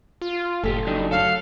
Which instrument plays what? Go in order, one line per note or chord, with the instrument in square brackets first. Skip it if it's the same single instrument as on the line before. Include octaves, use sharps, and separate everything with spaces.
[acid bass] F4
[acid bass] F#1 [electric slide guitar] A2 G4 [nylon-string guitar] A4
[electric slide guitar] F#3 D4 D#4 [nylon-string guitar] G3
[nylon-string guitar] D2 F#3 [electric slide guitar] A4 [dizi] F5